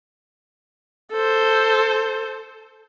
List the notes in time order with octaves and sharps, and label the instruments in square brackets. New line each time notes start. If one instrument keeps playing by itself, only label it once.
[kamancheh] A4 C5